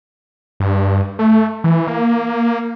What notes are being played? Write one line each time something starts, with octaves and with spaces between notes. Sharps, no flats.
G2
A3
E3
A#3